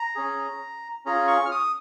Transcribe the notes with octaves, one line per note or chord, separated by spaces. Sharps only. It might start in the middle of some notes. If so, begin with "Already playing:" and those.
Already playing: A#5
C#4 G#4
C#4 F4 G#4 A#5
C#6
F6
D#6